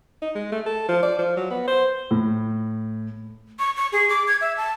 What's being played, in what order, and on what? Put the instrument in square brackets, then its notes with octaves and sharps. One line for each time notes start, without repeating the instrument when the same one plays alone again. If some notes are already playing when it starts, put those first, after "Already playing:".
[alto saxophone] D#4
G#3
A3
A4
F3
D5
F3
F#3
B3
C5
[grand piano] A2
[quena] C#6
C#6
G#4
D6
G#6
E5
A5